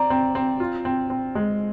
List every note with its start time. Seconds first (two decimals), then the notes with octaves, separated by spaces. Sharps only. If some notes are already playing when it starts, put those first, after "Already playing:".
Already playing: C4 D5 A#5
0.10 C4
0.35 C4
0.60 F4
0.85 C4
1.10 C4
1.35 G#3